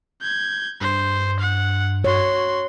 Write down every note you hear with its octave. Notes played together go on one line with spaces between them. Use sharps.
G6 G#6
G2 C5
F#5
F#4 C#5 C6